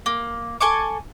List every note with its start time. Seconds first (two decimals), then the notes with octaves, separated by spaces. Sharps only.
0.06 A#3
0.60 A4 G#5 C#6 D6